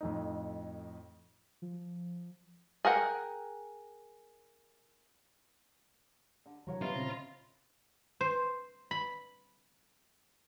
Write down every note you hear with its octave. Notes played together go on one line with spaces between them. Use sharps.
F2 A2 D#4
F3
G#4 A#4 F#5 G5
D3
C3 E3 F#3 A#4 C#5 F#5
G3 B3 E4 F4 D#5
A#2 C#3 C4 A#5
C5
B5